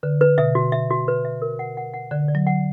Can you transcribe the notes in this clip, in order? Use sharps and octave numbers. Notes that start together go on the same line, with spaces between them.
D3 B4
B4
B2 E5
F#4
E5
F#4
B4
E5
A#4
F#5
F#5
F#5
D3 D5
D5
F#3
F#5